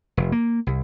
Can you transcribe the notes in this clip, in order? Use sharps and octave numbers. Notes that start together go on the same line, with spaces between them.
F1
A#3
C2